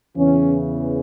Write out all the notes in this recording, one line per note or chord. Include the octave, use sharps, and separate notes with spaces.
E2 C#3 E3 C#4